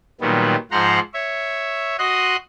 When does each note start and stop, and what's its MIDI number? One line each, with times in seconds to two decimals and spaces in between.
0.21 0.56 46
0.21 0.56 51
0.21 0.56 54
0.21 0.56 55
0.21 0.56 59
0.71 0.99 44
0.71 0.99 53
0.71 0.99 72
0.71 0.99 78
0.71 0.99 82
0.71 0.99 84
1.14 1.96 73
1.14 1.96 76
1.99 2.36 66
1.99 2.36 75
1.99 2.36 84
1.99 2.36 87
1.99 2.36 90